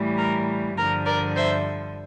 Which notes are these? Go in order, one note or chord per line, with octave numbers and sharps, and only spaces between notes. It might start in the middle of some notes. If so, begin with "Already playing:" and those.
Already playing: A2 E3 G3
A#4
G2 D3 F3 A#4
A#4 D5
C5 E5